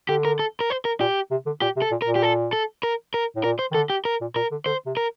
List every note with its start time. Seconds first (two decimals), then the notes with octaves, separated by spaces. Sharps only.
0.09 D3 G4
0.25 A#4
0.39 A4
0.60 A#4
0.70 C5
0.85 A#4
1.00 A#2 G4
1.31 C3
1.46 D3
1.62 A#2 G4
1.76 C3
1.82 A4
1.91 A#2
2.02 A#4
2.07 A#2
2.16 G4
2.22 A4
2.53 A4
2.83 A#4
3.14 A#4
3.36 A2
3.44 A#2 A#4
3.59 C5
3.71 D#3
3.74 D3 A4
3.90 G4
4.05 A#4
4.21 A#2
4.35 A#2 A#4
4.51 D3
4.66 D3 C5
4.86 C3
4.97 A#4